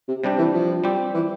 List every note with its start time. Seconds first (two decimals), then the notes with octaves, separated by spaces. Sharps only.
0.08 C3
0.24 C3 G3 D4 G4
0.38 E3
0.54 F3
0.84 G3 C4 G4
1.14 E3